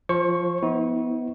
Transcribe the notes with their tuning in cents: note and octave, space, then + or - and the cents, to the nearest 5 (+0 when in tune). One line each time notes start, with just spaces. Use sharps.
F3 +0 C5 +35 C#6 +0
B3 +5 E4 -45